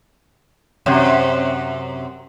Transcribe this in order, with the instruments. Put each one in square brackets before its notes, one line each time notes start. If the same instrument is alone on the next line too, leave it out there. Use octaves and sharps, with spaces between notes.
[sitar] F#2 C3